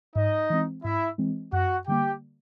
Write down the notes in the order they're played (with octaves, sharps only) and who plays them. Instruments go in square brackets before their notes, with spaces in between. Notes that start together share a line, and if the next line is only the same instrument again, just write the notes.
[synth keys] G#2 [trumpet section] D#4 D#5
[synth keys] E3 G#3 C4
[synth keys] G#2 [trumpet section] E4 E5
[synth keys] E3 G#3 C4
[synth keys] F#2 [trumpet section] F#4 F#5
[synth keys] D3 G3 A#3 [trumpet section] G4 G5